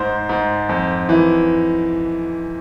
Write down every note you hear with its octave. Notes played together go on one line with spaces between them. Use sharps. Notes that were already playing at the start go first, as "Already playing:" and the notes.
Already playing: G#2 C5
G#2
F2
E3